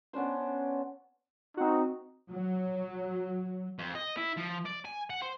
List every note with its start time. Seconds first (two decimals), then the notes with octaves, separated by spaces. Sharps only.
0.13 B3 C#4 D4 C5
1.57 C4 D#4 F#4
2.30 F#3
3.79 F2
3.95 D#5
4.17 E4
4.37 F3
4.65 D5
4.85 G#5
5.10 F#5
5.22 C5